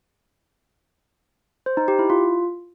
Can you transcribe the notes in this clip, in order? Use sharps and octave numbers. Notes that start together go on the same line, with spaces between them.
C5
D#4
G4
E4
F4